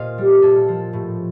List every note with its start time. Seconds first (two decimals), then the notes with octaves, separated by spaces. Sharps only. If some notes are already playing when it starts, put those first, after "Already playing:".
Already playing: A#2 C5 D#5 F5
0.18 G3
0.42 A#2 A4
0.68 F3
0.93 A2